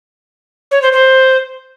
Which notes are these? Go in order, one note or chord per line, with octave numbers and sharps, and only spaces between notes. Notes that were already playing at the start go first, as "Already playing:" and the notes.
C#5
C5
C5